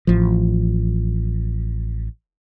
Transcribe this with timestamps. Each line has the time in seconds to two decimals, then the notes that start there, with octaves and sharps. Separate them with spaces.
0.07 A1 F3